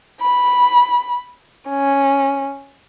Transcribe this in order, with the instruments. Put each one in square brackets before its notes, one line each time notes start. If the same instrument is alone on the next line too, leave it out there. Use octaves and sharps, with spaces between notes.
[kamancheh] B5
C#4